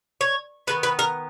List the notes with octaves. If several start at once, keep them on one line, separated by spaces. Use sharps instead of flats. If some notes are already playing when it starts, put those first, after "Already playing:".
C#5
D#3 G3 B3 B4
B4
A#4